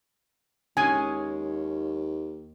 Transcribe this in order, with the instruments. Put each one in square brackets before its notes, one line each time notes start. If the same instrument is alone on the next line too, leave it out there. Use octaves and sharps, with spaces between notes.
[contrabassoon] D#2 [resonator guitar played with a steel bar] G#3 C#4 [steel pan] G#5